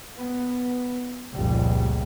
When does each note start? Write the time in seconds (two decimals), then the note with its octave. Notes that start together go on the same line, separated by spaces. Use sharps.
0.17 B3
1.34 F1 C#2 A#2 G3